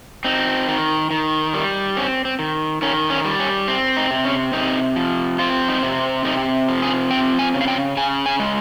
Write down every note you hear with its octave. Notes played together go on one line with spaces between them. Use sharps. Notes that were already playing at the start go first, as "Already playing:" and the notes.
C4 D#4
D#3
D#3
G3
C4 C#4
C4
D#3
D#3 C#4
C#4
G3
C#4
C4
D#4
C3
C#4
C3 D#4
F3
C4 F4
D#4
C3
C3 D#4
F3
G#4
C4 G5
G#5
C#3
F5
G5
C#3 G#5
G#5
G#3